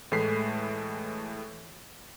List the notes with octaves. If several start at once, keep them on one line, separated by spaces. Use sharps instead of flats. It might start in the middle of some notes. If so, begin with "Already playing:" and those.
A2 E3 G#3 A3 B6 C7